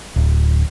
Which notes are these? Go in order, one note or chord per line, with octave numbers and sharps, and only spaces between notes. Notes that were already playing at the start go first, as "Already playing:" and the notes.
D1